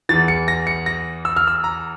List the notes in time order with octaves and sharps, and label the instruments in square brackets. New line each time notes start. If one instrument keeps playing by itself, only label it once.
[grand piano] E2 E3 A6
C#7
A#6
C#7
A#6
E6
F6
E6
A#5